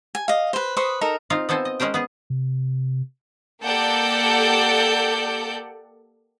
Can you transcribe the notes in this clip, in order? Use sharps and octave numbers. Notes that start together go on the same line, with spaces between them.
G#5
D#5 F5
B4 C5
B4 C5 C#6 D#6
D#4 A4 A#4 A#5
C4 D#4 F4 F5
B3 C4 A4 C5 G#5
D#5
G#3 C#4 A#4 C5 G5
B3 G#4
C3
A#3 G4 A4 D5 F#5 G6